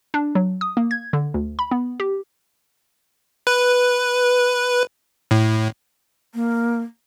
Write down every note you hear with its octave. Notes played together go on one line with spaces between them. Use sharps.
D4
F#3
D#6
A#3
G#6
D3
D2
B5
B3
G4
B4
A2
A#3